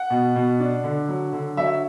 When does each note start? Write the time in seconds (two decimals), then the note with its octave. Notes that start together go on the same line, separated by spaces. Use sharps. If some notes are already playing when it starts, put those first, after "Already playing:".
Already playing: F#5
0.10 B2
0.36 B2
0.60 D4
0.84 D3
1.09 F#3
1.33 D3
1.57 F#3 E5